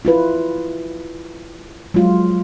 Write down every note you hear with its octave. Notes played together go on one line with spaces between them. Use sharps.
E4 F4 B4
F#3 G#3 F4